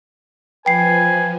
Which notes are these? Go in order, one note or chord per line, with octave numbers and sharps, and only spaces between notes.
F3 B4 G5 G#5 C7